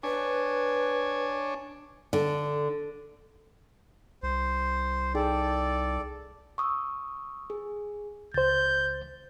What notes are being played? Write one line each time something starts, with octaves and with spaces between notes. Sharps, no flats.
D4 B4 C#5 G#5
D3
C2 C5
D#4 G#4 A4 D5 G5
C#6 D#6 E6
G#4
C#2 C5 G6 A6